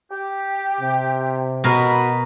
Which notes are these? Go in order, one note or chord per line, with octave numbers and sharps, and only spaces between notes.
G4
C3
B2 F#4 A#4 D#5 B5